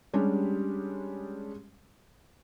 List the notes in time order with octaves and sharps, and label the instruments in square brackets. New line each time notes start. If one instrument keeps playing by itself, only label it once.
[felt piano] G3 G#3 C#4 D4 G4